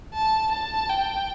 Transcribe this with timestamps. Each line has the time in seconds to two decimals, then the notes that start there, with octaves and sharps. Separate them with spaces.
0.14 A5
0.51 A5
0.89 G5